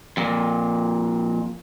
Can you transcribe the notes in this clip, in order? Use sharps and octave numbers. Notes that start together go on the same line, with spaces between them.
F2 A#2